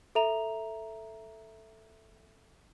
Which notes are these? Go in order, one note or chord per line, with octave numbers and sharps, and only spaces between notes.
A4 E5 A#5 F7